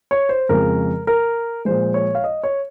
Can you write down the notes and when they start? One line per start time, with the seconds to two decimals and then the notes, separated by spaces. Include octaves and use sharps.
0.11 C#5
0.29 C5
0.49 F2 C#3 F3 G#3 A#4
1.07 A#4
1.65 A#2 F3 G#3 C5
1.94 C#5
2.15 F5
2.24 D#5
2.43 C#5